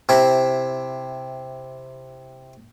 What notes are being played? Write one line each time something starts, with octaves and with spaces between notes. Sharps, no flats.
C3 E4